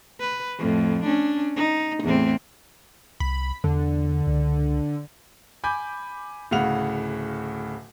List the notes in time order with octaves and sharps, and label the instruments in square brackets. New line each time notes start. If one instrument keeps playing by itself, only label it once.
[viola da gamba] B4
F2 A2
C#4 D4
D#4
E2 A2 C4
[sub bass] C2 [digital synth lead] B5
[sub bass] E2 [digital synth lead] D3
[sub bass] C#2
[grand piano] G#5 B5 D6 G6
D1 A2 C#3 F5 F#5 F7